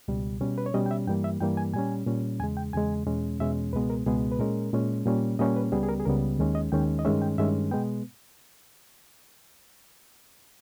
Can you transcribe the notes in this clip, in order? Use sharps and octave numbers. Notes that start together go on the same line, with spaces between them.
C#2 B2 G3
B2 G3 C#4
B4
C#5
B2 G3 C#4 D#5
G5
E5
G2 E3 G3 A#3 G5
E5
G2 E3 G3 A#3 G5
G#5
A#2 G3 C#4 G#5
A#2 G3 C#4
E2 C#3 G#3 G#5
G5
E2 C#3 G#3 G#5
E2 B2 G#3 C#4
E2 B2 G#3 C#4 E5
C#2 B2 G#3 B3 B4
A#4
C#2 B2 G#3 B3 G#4
B4
A#2 G#3 C#4 A#4
A#2 G#3 C#4
A#2 G3 A#3 C#4
A#2 G3 A#3 C#4 D#5
B4
C#2 C#3 G3 B3 G#4
G#4
A#4
G#4
C#2 C#3 G3 B3 A#4
D#2 D#3 G#3 C#4
D#5
D#2 D#3 G#3 C#4 G5
D#5
G2 D#3 G#3 C#4 E5
G5
G2 D#3 G#3 C#4 E5
B2 G#3 B3 G5